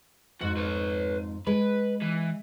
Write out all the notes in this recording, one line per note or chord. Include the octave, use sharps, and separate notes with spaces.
F2 G#2 F#4
B4 C#5
G#3 B4
E3